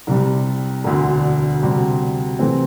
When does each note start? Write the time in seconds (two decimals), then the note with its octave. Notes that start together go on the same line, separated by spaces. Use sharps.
0.07 C2 C3 G3
0.84 E1 D2 D3
1.63 D2 C3 G3
2.39 C3 E3 A3 C4